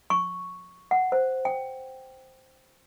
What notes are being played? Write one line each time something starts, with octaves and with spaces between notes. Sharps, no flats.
C#6
F#5
C5
G5